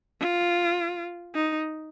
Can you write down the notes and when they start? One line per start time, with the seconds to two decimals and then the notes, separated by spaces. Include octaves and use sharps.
0.20 F4
1.35 D#4